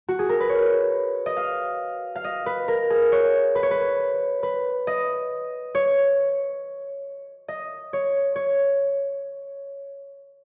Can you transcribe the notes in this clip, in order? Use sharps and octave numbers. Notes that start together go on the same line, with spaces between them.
F#4
G#4
A#4
B4
C#5
D#5
F5
F5
D#5
B4
A#4
G#4
C#5
B4
C#5
B4
B4
D#5
C#5
D#5
C#5
C#5